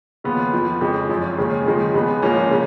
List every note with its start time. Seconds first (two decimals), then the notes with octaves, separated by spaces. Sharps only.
0.24 D#2 C#3 F3 B3 F4
0.52 F2 F3 B3
0.81 F2 C#3 F3 G#3
1.09 G#1 F#2 F3
1.38 D#2 C#3 G#3 C#4
1.66 D#2 C#3 F3 G#3 D#4
1.94 C#2 C#3 G#3 B3
2.22 G#1 G#2 F3 A#3 C#4
2.51 C#3